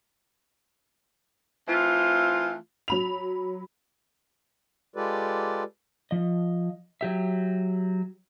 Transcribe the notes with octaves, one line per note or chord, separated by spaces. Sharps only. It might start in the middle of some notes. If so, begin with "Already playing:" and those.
E3 A3 C4 F4
F#3 B5 F7
G#3 F4 G4 A4 B4 D5
F3 D#5
F#3 G4 E5